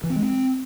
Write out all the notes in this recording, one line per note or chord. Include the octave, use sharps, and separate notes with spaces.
E3
C4
G#3
C4